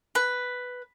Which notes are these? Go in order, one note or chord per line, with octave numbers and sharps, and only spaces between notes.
B4